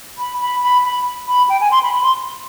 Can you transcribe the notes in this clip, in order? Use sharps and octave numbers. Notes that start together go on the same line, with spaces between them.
B5
B5
B5
B5
B5
G5
G#5
C6
B5
B5
C6